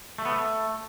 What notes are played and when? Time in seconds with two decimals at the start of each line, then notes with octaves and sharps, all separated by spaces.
0.18 A3
0.25 B3
0.32 A3